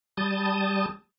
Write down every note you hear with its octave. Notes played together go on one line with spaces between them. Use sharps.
G3 A5 D#6